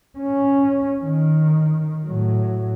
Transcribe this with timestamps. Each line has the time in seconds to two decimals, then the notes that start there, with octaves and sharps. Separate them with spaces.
0.19 C#4
1.04 D#3
2.06 A2 F#3